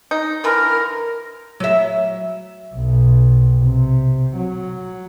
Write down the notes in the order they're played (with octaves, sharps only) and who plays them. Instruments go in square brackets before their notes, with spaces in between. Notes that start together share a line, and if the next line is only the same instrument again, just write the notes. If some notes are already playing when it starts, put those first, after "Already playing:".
[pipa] D#4
[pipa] D3 E3 [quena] A#4
[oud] F#3 E5
[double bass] B1
C3
F#3